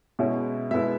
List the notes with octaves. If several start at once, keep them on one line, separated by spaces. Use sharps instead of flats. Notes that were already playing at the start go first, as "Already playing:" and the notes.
B2 G#3 C#4 E4
B2 G#3 B3 E4 E5